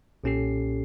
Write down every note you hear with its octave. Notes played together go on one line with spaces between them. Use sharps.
B1 A#2 C#4 G4 A4 C7